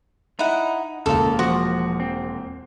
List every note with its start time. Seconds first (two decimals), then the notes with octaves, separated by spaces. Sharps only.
0.39 D#4 E4 F#5
1.06 E1 A#2 C#3 F4 A4 A#4
1.39 F3 F#4 C5
2.00 C4